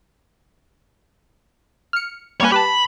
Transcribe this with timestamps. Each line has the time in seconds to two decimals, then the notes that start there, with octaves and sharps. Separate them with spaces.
1.93 F6 C#7
2.40 G3 A#3 B4 C#5 G#5
2.52 G4 B4 A5 B5